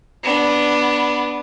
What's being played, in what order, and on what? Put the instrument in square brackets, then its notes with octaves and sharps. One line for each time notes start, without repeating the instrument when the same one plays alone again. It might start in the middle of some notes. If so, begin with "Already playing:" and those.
[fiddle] B3 D4